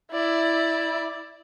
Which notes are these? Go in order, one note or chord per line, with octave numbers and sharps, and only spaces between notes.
E4 D5